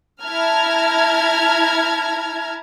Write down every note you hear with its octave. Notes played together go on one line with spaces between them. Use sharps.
E4 A5 A#5 F6 G#6